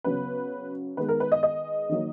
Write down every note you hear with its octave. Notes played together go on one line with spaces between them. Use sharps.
C#3 F#3 B3 B4
D#3 G#3 B3 B4
A#4
B4
D#5
D#5
D#3 F#3 A#3